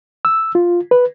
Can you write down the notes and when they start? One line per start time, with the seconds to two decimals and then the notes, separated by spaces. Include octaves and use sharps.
0.25 E6
0.55 F4
0.91 B4